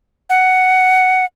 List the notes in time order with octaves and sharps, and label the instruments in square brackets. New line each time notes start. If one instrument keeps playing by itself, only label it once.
[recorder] F#5